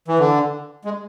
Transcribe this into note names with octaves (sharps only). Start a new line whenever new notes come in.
E3
D3
G#3